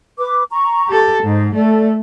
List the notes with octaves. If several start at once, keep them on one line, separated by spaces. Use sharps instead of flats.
B4 D6
A#5 C#6
G4 A4
G#2 D#4 C5
A3 A4 D5